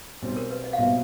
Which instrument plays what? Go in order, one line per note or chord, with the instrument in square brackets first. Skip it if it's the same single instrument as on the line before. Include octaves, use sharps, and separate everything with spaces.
[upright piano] B1 B2 G3 C4
[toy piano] A#4
B4
D#5
F5
[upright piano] B1 B2 G3 C4 [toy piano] E5